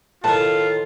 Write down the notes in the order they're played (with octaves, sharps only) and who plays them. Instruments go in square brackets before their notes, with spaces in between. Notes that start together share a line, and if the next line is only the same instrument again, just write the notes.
[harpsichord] A2 D#3 [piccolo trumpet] F4 [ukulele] B4 A5